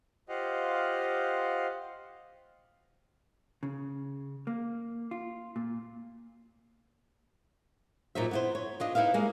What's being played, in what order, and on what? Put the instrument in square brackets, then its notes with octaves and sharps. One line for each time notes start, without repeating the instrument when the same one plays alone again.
[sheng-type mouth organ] F4 G4 C5 D#5 F5 F#5
[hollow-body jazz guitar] C#3
A#3
F4
A#2
[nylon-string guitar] A#2 F#3 D#4 C5 E5
B3 E4 C5
C#5
D4 F4 D#5
D#4 E4 B4 E5 F5
G3 G#3 A#3